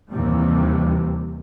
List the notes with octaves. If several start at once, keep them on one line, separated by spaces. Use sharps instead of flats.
D#2 C3 E3 G3